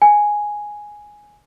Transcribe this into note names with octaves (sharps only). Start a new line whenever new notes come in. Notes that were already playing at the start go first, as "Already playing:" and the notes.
G#5